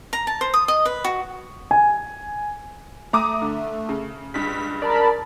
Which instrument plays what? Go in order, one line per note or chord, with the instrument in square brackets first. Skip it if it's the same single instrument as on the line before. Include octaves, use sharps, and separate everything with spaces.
[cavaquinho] A#5
A5
C5
D#6
D#5
B4
F#4
[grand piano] G#5
[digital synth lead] A3 [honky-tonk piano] A#5 D6 D#6
[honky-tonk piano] D3
C#3
[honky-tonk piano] C#2 G2 [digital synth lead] B6
[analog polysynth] A#4 A5 B5 [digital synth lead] D5